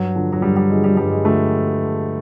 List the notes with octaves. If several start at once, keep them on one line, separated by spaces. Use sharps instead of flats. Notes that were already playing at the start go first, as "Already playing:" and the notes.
Already playing: G2 F#3
D3 F3
F#3
G2 G3
G3
D3 F3 G#3
G3
G2 G3
G#3
D3 F3 A3